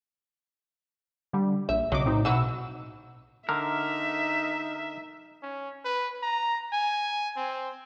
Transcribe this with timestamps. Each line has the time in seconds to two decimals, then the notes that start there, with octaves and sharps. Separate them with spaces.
1.33 D3 G3
1.69 A#1 E5
1.92 B1 C#3 F#3 D#5 D6
2.06 A2 C4 D#4
2.25 B2 E3 F#3 F#4 E6
3.49 D3 D#4 A#4 E5
5.43 C#4
5.84 B4
6.23 A#5
6.73 G#5
7.37 C4